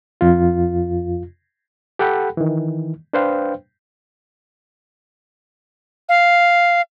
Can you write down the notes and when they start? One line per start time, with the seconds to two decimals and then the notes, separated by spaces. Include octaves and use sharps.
0.21 F2 F4
1.99 G4 A4 F#5 G5 B5
2.37 D#3 E3
3.13 D4 B4 C5 F5 G5
6.09 F5